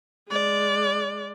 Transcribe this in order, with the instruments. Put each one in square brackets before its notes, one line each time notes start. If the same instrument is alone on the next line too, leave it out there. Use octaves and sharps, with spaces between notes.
[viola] G#3 D5